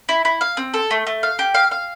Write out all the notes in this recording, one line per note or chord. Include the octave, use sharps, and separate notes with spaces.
E4
E4
F5
C4
A4
A3
A3
F5
G4
F5
F5